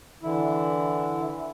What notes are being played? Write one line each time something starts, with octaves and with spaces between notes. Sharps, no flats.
D3 E3 E4